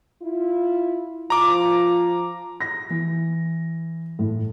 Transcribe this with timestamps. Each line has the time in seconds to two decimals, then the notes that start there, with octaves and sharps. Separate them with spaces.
0.22 E4 F4
1.30 F3 F4 A#5 D6
2.61 A#6
2.90 E3
4.19 A2